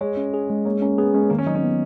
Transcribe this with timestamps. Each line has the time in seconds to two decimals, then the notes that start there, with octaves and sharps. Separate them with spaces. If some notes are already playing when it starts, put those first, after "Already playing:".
0.01 G#3 C#5
0.17 C#4
0.34 G#4
0.50 G#3
0.65 A#3 C#5
0.82 A#3 C#4
0.98 B3 G#4
1.14 G#3 C#4
1.30 D#3 A#3
1.38 C#4
1.47 F#3 D#4
1.55 C#4
1.63 B3